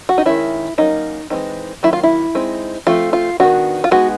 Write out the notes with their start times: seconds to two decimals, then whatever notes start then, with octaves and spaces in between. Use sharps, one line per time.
0.09 F#4
0.18 D#4
0.25 D#3 G#3 C#4 E4
0.78 F#3 A#3 C#4 D#4
1.30 E3 G#3 C4 D#4
1.83 D#3 F#3 A#3 E4
1.93 F4
2.03 E4
2.35 G#3 C4 D#4
2.87 F3 A3 C4 F4
3.13 F4
3.40 D#3 G3 B3 D4 F#4
3.84 F4
3.91 G#3 B3 D#4 F#4